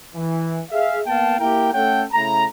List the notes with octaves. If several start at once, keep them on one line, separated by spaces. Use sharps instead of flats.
E3
G#4 E5 F5
A#3 B3 F5 G5 A5
A#3 E4 G4 A#4 G5
A3 C#4 A4 C#5 F#5 G5
C#3 A3 E4 A#5